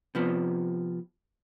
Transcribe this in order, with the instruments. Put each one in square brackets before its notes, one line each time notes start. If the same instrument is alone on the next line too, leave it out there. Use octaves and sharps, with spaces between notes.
[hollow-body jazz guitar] C3 F3 B3